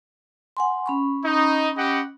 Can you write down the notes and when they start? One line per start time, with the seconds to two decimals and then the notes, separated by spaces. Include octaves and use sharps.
0.57 F#5 G#5 C6
0.86 C#4 B5 C#6
1.25 D#4
1.77 G4 D#5 F#5